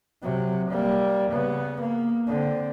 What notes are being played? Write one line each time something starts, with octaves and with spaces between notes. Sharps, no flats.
C3 F#3
G3 A#3
C#3 B3
A#3
D3 C4